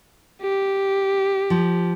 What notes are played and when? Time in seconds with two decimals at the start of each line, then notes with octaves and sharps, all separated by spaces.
0.42 G4
1.50 F3